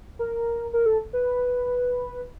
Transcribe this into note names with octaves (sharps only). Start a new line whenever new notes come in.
A#4
A#4
A4
B4